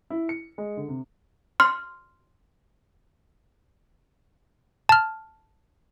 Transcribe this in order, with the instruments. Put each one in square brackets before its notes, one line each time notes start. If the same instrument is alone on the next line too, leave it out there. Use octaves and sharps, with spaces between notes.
[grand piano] E4
C#7
G#3
D3
C3
[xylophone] C6 F6
[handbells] A5 F6